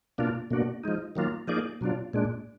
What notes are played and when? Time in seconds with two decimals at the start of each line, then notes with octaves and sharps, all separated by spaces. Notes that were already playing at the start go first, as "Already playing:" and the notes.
0.18 B2 A#3 D4 F4
0.51 B2 A#3 D4 F#4
0.84 F3 G#3 D#4
1.15 D#3 F#3 A#3 F4
1.47 F3 A#3 D#4 G#4 D5
1.81 B2 F#3 D4 F4
2.13 A#2 G#3 D4